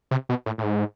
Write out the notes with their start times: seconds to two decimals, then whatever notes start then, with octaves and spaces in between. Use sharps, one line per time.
0.11 C3
0.29 B2
0.46 A2
0.58 A2
0.63 G#2